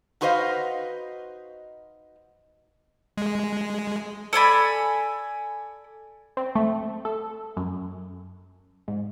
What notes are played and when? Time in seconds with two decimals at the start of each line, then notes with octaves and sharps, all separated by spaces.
0.21 D#4 F#4 B4 C5 D#5 F5
3.17 G#3
4.33 A4 D5 G#5 B5
6.37 C4
6.55 A3
7.05 A4
7.57 F#2
8.88 G#2